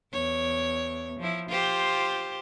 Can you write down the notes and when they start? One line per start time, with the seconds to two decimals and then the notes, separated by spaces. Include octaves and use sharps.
0.12 E2 C#5
1.20 F3 E4
1.49 F4 G4 C5